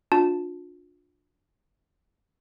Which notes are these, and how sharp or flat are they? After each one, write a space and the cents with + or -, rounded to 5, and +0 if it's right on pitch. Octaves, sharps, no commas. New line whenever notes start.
D4 +0 F4 +35 A5 +0